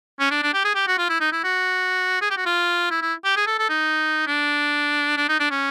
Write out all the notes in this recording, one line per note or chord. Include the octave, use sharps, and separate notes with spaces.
C#4
D4
D4
G4
G#4
G4
F#4
F4
E4
D#4
E4
F#4
G#4
G4
F#4
F4
E4
E4
G4
G#4
A4
A4
D#4
D4
D4
D#4
D4
C#4